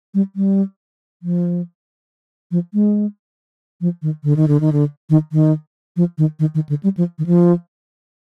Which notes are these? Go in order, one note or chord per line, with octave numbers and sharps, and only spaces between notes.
G3
G3
F3
F3
G#3
F3
D#3
D3
D#3
D3
D#3
D3
D#3
D#3
F3
D#3
D#3
D#3
D3
G3
F3
D#3
F3